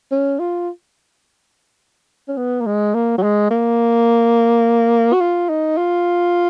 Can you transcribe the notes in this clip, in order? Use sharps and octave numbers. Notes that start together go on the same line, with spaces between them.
C#4
F4
C#4
B3
A#3
G#3
A#3
F#3
G#3
A#3
F#4
F4
D#4
F4